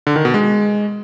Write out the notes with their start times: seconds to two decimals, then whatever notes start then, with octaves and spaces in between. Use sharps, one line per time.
0.07 D3
0.16 D#3
0.25 B2
0.34 G#3